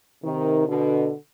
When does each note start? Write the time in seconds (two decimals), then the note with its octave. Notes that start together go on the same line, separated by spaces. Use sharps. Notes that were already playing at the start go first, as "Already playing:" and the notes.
0.23 C3 D#3
0.67 B2 D3